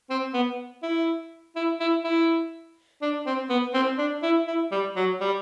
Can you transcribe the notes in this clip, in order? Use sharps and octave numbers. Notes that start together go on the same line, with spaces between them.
C4
B3
E4
E4
E4
E4
D4
C4
B3
C4
D4
E4
E4
G3
F#3
G3